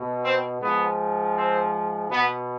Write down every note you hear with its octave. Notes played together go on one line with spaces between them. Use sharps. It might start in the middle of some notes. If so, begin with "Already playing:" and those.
Already playing: B2
C4
G#2 F3 B3
C4
B2 B3